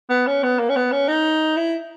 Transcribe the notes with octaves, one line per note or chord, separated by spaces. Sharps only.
B3
C#4
B3
A#3
C#4
B3
C#4
D#4
E4